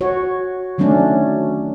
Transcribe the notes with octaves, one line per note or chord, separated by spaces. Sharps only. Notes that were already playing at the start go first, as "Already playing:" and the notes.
F#4 C#5
D#3 F#3 A3 C#4 D4